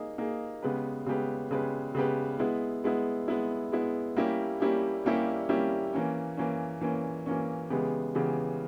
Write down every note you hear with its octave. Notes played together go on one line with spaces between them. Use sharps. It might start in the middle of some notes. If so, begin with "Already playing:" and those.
Already playing: A#3 D#4 G#4
A#3 D#4 G#4
C#3 G#3 B3 G4 B4
C#3 G#3 B3 G4 B4
C#3 G#3 B3 G4 B4
C#3 G#3 B3 G4 B4
G#3 B3 E4
G#3 B3 E4
G#3 B3 E4
G#3 B3 E4
G3 A#3 C#4 E4 G4
G3 A#3 C#4 E4 G4
G3 A#3 C#4 E4 G4
G3 A#3 C#4 E4 G4
E3 A#3 C#4
E3 A#3 C#4
E3 A#3 C#4
E3 A#3 C#4
C#3 E3 G#3 B3 G4
C#3 E3 G#3 B3 G4